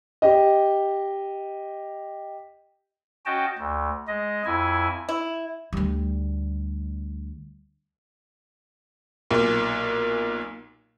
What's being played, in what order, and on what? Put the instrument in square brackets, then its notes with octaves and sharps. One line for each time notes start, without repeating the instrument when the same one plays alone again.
[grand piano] G4 D#5
[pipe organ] C#4 F#4 D#5 G5 A5
D2
G#3 D#5
F2 E4 G#5
[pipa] E4
[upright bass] D2 G3
[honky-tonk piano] B1 A#2